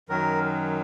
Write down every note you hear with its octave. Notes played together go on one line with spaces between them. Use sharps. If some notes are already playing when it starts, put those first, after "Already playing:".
F#2 D#3 F#3 A#4